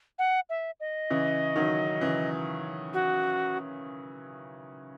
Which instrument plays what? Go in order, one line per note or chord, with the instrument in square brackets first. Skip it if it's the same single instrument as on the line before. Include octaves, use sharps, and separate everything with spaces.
[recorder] F#5
E5
D#5
[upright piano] C#3 E3
D#3 F#3
C#3 E3
[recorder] F#4